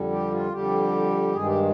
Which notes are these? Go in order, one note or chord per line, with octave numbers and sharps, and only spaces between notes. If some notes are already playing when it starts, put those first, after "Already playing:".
Already playing: F2 D3 G3
G4
F4
F2 D3 G3 G4
G2 D#3 G#3 G#4
G4